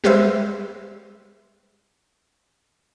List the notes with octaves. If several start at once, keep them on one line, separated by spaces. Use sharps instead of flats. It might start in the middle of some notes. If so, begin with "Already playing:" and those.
G3 G#3 G4 B4 C5 E5